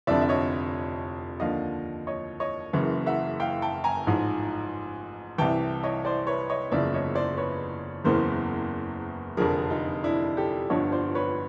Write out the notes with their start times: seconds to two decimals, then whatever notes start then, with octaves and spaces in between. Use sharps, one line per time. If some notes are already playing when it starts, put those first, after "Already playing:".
0.07 F1 F2 D3 F3 D5 E5
0.22 E5
0.29 C#5 D#5
1.40 D#2 D3 F3 D#5 F5
2.07 C#5 D#5
2.40 C#5 D#5
2.73 F#1 F#2 C#3 E3
3.06 E5 F#5
3.40 F5 G5
3.62 G5 A5
3.84 G#5 A#5
4.07 A1 G#2 F3
5.38 C2 C3 E3 G5 A5
5.83 C#5 D#5
6.05 C5 D5
6.27 B4 C#5
6.50 C#5 D#5
6.71 F#1 E2 C#3 F3 D5 E5
6.94 C#5 D#5
7.15 C5 D5
7.37 B4 C#5
8.04 F#1 E2 C#3 E3 A#4 C5
9.37 F1 F2 D3 F3 G#4 A#4
9.70 D#4 F4
10.03 D4 E4
10.37 G4 A4
10.70 G1 G2 D3 F3 C#5 D#5
10.92 C5 D5
11.15 B4 C#5